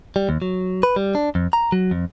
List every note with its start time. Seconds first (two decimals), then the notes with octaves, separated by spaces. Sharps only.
0.16 G3
0.29 D#2
0.42 F#3
0.83 B4
0.96 G3
1.15 D4
1.35 F2
1.53 A#5
1.72 F#3
1.91 F2